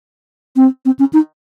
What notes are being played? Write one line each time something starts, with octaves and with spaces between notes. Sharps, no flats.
C4
C4
C#4
D#4